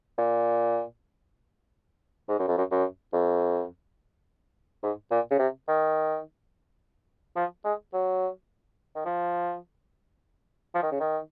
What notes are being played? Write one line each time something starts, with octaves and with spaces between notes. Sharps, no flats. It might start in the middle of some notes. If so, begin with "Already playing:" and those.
A#2
G#2
F#2
F2
F#2
F#2
F2
G#2
A#2
C#3
C3
D#3
F3
G#3
F#3
D#3
F3
F3
D#3
C#3
D#3